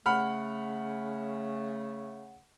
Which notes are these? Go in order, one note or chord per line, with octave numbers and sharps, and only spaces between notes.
C#3 A3 F#5 B5 F6